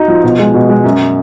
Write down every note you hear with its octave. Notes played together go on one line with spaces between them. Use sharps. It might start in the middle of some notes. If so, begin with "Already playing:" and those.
Already playing: D#4 F#4
F3
B2
G#3
B2
G#3
F#2